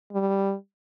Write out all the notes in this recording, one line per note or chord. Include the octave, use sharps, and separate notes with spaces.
G3